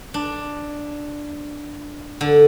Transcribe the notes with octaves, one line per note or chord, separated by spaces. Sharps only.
D4
D3